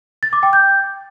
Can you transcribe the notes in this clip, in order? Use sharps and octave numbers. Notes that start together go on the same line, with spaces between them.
A6
D6
G5
G6